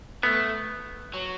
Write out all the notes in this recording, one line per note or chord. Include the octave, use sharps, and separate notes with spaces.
A3 B3
F#3